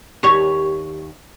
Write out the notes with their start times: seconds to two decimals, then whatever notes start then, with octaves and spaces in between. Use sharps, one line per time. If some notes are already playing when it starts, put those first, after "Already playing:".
0.23 D#2 G4 C#5